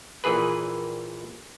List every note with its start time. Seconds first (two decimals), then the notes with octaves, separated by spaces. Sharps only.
0.24 A#1 A#2 E3 G#4 B4